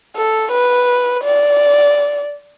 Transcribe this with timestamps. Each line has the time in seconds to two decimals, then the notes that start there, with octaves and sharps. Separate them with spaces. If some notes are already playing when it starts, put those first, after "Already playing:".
0.16 A4
0.52 B4
1.24 D5